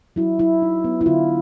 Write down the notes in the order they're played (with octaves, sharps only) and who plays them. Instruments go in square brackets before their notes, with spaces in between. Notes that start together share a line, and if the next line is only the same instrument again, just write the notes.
[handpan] F#3 E4
F#3 E4
D#4
B3
E4
D3 F4